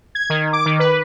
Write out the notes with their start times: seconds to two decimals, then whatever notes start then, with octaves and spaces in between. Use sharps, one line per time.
0.15 G#6
0.30 D#3
0.53 D6
0.66 D#3
0.79 B4